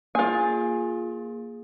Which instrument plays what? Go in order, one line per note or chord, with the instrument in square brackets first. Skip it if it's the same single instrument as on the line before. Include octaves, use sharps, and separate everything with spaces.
[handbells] A#3 G#4 [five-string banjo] F4 G#5